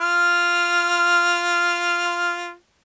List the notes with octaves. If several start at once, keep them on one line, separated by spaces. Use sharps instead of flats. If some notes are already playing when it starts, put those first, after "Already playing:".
F4 F6